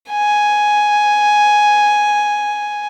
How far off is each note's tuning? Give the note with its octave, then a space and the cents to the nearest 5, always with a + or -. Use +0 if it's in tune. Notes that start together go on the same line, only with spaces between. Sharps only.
G#5 +5